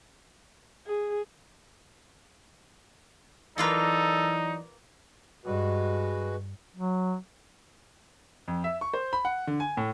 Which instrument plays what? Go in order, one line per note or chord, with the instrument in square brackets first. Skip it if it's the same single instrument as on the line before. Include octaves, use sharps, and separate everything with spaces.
[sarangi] G#4
[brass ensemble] E3 F#3 D5 [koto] A#3 F4 B4 [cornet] D#4 [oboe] A4
[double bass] G2 [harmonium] G#3 F#4 B4
[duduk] F#3
[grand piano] F2
E5
C#6
C5
B5
F#5
D3
G#5
A2